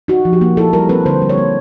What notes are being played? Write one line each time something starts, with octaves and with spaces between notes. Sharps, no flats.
D#4 F#4
F3
G4
A#3
E4 A4
G3 A#4
C4 B4
D3 C5
G3
C#5
A#3